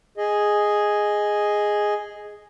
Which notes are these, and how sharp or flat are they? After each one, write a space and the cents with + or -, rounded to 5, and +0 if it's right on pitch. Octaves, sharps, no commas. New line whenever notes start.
G#4 +0 D#5 +0